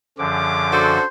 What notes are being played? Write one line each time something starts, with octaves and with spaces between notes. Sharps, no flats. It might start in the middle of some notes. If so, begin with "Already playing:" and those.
F#2 D3 F3 C#4 G#4 D6
D4 F#4 A4 C5